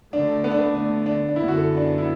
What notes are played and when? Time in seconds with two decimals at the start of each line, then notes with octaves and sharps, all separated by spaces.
0.13 D2 D3 A3 D4
0.44 B3
0.51 D4
0.59 B3
0.75 D4
1.06 D4
1.29 D4
1.36 F#2 D3 B3 E4
1.48 F#4
1.57 A4
1.77 D4
1.98 E4